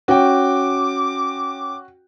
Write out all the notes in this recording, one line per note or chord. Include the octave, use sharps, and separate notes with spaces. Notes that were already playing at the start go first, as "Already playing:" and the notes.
C#4 F#4 G5 D6